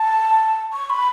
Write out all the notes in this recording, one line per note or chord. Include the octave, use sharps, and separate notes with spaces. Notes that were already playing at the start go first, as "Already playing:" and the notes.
Already playing: A5
C#6
B5